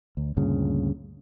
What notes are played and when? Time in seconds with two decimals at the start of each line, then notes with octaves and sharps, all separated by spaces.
0.17 D2
0.37 D2 G2 A#2 C#3